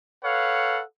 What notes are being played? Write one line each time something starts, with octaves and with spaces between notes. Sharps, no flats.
A4 B4 C#5 F5 F#5